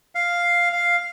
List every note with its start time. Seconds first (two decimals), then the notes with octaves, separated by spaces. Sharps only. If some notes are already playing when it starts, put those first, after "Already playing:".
0.15 F5
0.73 F5